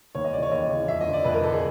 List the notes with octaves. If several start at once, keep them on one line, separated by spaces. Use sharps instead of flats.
D#2 C#5
D#5
C#3 E3 D5
C#5
D#2 D#5
C#3 E3
F2 E5
D#5
D3
D5
F2 B4
A#4
D3 A4
G#4